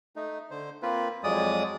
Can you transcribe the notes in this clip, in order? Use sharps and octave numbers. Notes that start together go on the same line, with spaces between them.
A3 D#4
D3 C5
A#3 C4 F4 B4
F2 F#3 G#3 D5 D#6